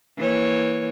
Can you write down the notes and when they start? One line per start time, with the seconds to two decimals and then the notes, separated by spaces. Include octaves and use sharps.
0.17 E3 A#3 C#5